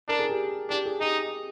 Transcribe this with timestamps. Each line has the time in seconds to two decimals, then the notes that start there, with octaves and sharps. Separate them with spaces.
0.08 D4 A#4
0.19 G#4
0.29 G4
0.70 D4 G4
0.85 G#4
1.01 D#4 G4